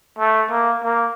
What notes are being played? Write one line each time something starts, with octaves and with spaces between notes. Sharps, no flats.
A3
A#3
A#3